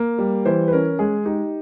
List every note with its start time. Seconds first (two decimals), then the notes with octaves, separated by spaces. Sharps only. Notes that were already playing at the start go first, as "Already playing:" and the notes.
Already playing: A#3
0.18 G3
0.45 E3 C5
0.68 B4
0.73 C#4 A#4
0.99 G#3 G#4
1.25 D#4 G4